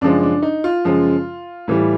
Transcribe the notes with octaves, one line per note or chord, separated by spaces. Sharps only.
F#2 C#3 F3 G#3 D4
D4
D#4
F4
F#2 C#3 F3 G#3
A2 E3 G3